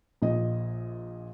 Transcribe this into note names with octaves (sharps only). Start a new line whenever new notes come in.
A#1 A#2 D#5